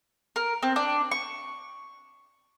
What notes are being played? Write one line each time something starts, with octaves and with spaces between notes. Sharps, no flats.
A#4
C4
D4
C#6